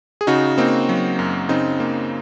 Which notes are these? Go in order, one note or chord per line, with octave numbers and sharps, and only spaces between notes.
G#4
C#3 D#4 F#4
A#3 C4 D#4
F#3
F#2
C#3 C4 D#4
A#3